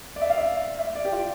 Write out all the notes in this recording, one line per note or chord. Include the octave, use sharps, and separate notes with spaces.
D5
E5
F5
E5
E5
D5
G4
F4